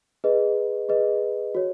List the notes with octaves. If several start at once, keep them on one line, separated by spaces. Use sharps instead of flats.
G#4 B4 D#5
G#4 B4 D#5
F#4 C#5